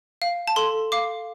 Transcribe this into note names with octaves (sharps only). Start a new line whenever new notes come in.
F5
A5
A4 C6
F5 D6